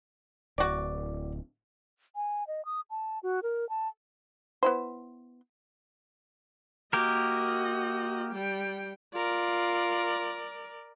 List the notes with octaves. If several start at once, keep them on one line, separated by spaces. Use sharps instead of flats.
D1 F#4 D5
G#5
D#5
D#6
A5
F#4
A#4
A5
B3 E4 C5
A#3 F#4 G4 A#4 D#5
G3 G5
F4 A#4 D5